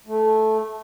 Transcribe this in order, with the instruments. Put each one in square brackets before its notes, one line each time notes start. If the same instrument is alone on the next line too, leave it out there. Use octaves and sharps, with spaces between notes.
[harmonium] A3